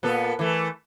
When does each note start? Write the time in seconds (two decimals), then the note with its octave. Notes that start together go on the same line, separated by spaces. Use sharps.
0.03 A#2 B3 A4
0.39 E3 A3